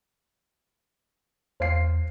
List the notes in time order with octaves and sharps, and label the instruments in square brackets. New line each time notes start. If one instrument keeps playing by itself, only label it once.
[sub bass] E2 [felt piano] C5 F5 C7